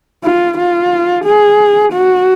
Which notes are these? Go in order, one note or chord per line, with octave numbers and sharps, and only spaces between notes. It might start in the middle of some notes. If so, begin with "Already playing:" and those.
F4
F4
G#4
F#4